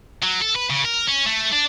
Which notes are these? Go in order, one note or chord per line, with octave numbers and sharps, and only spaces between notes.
F#3
A4
B4
C#3
A#4
C#4
A3
D4